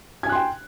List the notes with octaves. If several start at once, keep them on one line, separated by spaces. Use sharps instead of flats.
G5 G#5 C6 F#6 G#6